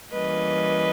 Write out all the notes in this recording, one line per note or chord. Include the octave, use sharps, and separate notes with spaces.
E3 G3 A#3 C#4 B4 D#5